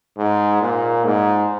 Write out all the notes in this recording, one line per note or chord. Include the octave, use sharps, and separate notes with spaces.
G#2
A#2
G#2